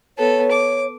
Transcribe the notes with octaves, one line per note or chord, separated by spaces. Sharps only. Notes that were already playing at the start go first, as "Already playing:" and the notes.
B3 A4 C#5
D6